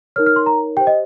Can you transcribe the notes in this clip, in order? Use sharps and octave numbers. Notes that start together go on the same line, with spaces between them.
D#4 A#4 C#5 F6
F6
C6
A#5
G4 C5 G5
D#5